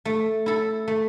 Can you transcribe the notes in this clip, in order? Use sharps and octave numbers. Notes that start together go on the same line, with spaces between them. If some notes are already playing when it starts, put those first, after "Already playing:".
A3
E4 A4
A3